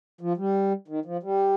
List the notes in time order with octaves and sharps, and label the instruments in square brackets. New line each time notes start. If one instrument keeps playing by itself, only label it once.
[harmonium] F3
G3
D#3
F3
G3